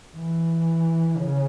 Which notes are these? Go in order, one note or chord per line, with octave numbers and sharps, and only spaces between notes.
E3
C#3